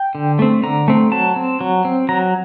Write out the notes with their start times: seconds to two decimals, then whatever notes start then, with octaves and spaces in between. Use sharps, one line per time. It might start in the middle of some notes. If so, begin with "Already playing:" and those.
Already playing: G5
0.15 D3
0.39 A3 C4
0.63 D3 A#5
0.88 A3 C4
1.12 F#3 A5
1.36 C4
1.61 F#3
1.85 C4
2.09 F#3 A#5